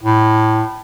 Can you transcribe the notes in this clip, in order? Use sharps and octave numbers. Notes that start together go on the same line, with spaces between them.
A2